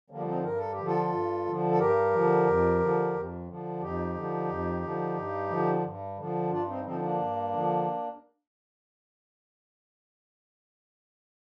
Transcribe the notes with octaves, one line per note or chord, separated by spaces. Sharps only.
D3 F3 G3 A#3
C4 D#4
G2 A#4
A4
G4
D3 F3
F4 A4
G2
D3 F3
A4
G2 G4 A#4
D3 F3
F2
D3 F3
F2
D3 F3
F2 D#4 G4
D3 F3
F2
D3 F3
G2
D3 F3
G2
D3 F3
G2 D4 F4
C4 D#4
D3 F3 C4 D#4
A#3 D4
G2
D3 F3